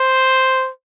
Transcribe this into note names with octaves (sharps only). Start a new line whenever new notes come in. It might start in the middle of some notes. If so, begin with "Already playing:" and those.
Already playing: C5